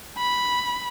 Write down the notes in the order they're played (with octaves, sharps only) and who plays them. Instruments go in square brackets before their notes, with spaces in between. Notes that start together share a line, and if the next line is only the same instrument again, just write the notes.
[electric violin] B5